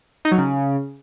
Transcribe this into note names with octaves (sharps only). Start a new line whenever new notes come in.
D#4
F#3
C#3